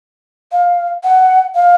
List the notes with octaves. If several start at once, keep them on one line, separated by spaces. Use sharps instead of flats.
F5
F#5
F5